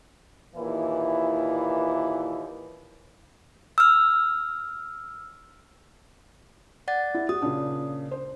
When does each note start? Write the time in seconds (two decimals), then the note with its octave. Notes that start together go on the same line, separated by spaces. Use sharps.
0.53 D#2 A#2 E3 E4
3.78 E6 F6
6.88 D5 F#5 A6
7.14 E4
7.29 F#4 D#6
7.42 A#2 C#3 D4
8.11 C5